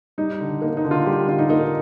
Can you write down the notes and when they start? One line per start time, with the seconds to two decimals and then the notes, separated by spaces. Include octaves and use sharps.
0.18 G3 D#4
0.40 D3
0.62 A#3 D#4
0.77 D#4
0.85 D3
0.91 F4
1.06 G3 G4
1.29 D3 F4
1.39 D#4
1.50 A#3 D#4